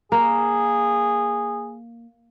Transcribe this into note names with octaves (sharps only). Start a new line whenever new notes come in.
A#3 G#4